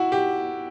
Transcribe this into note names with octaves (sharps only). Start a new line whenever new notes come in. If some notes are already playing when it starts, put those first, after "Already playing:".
Already playing: E4 F#4
G4